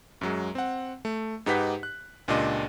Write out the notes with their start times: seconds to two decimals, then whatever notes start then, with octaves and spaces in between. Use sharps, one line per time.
0.21 F#2 F#3 G#3
0.55 C4 F#5
1.05 A3
1.46 G#2 D#4 G4 B4 F#5 B6
1.83 F#6
2.28 C#2 A#2 D4 G4 D#5 C6